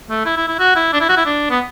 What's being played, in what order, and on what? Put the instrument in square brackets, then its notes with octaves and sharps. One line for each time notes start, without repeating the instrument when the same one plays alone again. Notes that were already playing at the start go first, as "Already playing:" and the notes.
[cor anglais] A3
E4
E4
E4
F#4
E4
D4
E4
F#4
E4
D4
B3